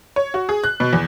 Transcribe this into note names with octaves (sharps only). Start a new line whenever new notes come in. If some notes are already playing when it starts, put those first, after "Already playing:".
C#5
F#4
G#4
F#6
B2
E2